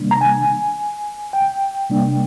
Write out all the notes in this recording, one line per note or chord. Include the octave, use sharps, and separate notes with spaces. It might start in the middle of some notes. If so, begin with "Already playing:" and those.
Already playing: C3 D#3 G3 A#3 D4
A#5
G#5
G5
C3 G3 A#3 D4